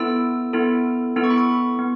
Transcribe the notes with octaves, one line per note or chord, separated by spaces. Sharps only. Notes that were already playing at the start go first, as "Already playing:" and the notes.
Already playing: B3 E4 A4 E6
B3 E4 A4
B3 E4 A4 E6
C#6
B5
C#6
B3